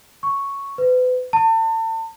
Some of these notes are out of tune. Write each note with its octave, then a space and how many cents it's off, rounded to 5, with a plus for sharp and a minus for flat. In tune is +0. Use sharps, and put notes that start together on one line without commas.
C#6 +0
B4 +35
A5 +35